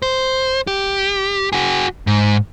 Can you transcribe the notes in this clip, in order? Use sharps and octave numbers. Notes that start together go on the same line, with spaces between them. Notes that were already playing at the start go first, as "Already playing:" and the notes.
C5
G4
F#4 G#4
G#2